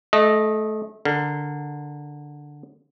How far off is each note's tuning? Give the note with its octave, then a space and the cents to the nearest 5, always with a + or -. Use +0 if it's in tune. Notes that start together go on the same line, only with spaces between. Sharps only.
A3 -25 D#5 +0
D3 +0 A#4 -10